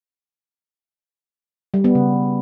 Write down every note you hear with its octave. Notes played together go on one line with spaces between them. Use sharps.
G3
B3
C#3